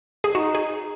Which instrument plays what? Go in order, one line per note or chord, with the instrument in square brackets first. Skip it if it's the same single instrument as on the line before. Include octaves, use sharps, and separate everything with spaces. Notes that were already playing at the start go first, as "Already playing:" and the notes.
[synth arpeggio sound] G#4
[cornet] D#4 [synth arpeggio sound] F#4
[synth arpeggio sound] G#4